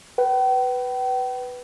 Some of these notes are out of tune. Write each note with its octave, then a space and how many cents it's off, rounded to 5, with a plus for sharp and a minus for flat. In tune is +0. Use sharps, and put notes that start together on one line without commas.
B4 +0 G5 -40